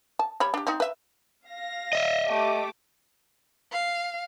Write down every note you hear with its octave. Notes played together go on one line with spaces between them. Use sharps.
A5
G3 C#5 B5
D4 G4
C4 D#4
B4 E5
F5 A#6
D#5 E5
A3 G4 D6
F5